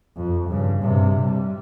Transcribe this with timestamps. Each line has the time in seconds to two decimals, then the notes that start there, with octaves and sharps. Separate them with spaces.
0.16 F2
0.48 G2 C#3
0.82 G2 C3
1.22 G3